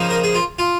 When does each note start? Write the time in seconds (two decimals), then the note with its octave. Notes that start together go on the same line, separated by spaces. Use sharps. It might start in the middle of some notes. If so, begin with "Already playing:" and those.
Already playing: C#3 F3 A#3 D#4
0.10 A#4
0.24 G#4
0.34 F4
0.59 F4